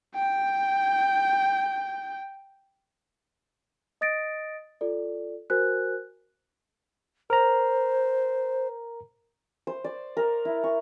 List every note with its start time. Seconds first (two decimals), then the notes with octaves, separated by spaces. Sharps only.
0.15 G5 G6
4.01 D#5 D#6 A6 A#6 D7
4.81 F4 A4 D5
5.50 F#4 A#4 C5 G#5 F#6
7.30 A#4 C5 A#5
9.67 C5
9.84 D5
10.17 A#4
10.45 E4
10.64 C#6